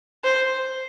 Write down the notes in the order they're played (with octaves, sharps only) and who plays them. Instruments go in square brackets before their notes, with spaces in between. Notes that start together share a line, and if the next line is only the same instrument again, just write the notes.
[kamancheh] C5